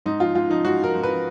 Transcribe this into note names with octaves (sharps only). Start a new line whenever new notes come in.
G#2 D#4
F3 F4
G#2 F4
F3 D#4
G#2 F#4
F3 A#4
G#2
F3 B4